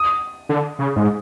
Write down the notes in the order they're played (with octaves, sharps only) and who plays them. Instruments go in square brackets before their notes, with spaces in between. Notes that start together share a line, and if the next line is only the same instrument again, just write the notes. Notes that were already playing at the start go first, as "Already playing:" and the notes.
Already playing: [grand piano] D#6
[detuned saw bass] D3
C#3
G#2